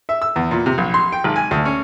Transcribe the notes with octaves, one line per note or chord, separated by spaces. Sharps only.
E5
E6
E2
A#2
C3
A#1
C6
G5
G#1
G#5
D2
C#4